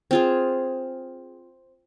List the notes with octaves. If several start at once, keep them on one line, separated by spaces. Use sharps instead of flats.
C4 F4 G#4